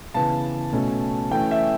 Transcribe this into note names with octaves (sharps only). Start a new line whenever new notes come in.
C#3 E3 B3 A5
B2 A3 C#4
E3 A3 C#4 G5
E5